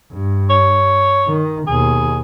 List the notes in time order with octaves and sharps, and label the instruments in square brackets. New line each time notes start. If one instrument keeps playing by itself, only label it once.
[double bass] G2
[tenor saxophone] C#5
[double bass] D#3
[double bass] D#2 B2 [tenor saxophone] G#4